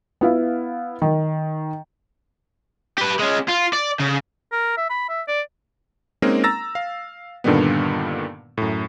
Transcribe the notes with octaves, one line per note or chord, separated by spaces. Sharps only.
B3 E4 F5
D#3
G4 B4
G#3 C#4
F4
D5
C#3
A#4
E5
B5
E5
D5
G#3 A#3 C4 C#4 D#4 A#4
A#5 E6 A6 A#6
F5
G2 A#2 D3 D#3 G3 B3
F#2 A2